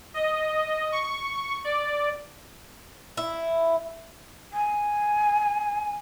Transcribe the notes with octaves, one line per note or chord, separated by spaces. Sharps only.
D#5
C#6
D5
E4
G#5